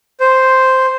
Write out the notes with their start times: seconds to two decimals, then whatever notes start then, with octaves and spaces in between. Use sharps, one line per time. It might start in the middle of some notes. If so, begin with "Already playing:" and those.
0.20 C5